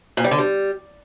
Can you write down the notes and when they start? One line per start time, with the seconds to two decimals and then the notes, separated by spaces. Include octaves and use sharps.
0.17 A#2
0.24 G3
0.31 D3
0.38 G3